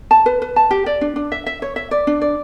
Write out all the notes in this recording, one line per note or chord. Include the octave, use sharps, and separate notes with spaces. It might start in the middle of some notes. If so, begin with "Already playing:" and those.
A5
B4
B4
A5
G4
D5
D4
D4
E5
E5
C#5
E5
D5
D4
D5